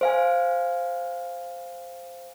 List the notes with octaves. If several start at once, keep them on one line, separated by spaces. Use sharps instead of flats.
C5 F5 G#5